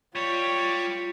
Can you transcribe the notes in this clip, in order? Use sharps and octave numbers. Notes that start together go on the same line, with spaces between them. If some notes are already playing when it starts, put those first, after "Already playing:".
G3 F4 C#5